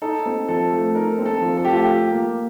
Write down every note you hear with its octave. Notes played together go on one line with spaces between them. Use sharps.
D#4 A4
C4
F3 A4
A3
D#4 A#4
C4
A4
F3
A4
A3 G4
F4
G4
F4
A#3